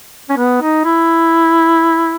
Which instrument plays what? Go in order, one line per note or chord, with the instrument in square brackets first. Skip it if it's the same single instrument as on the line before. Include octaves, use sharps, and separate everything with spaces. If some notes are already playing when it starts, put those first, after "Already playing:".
[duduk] C#4
B3
D#4
E4